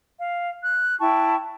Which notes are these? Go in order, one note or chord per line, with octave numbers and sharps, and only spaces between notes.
F5
F#6
E4 G5 A5 C#6